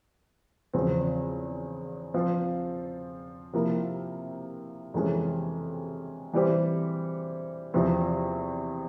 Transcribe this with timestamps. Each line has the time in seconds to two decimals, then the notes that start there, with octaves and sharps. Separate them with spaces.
0.73 E2 C#3 F3 C4
2.14 F3 C4 F4 C5
3.53 C3 F3 A#3 E4 A#4
4.94 F2 C3 E3 G#3 C#4
6.33 E3 G3 C4 G4 C5
7.74 E2 C3 F3 C4 E4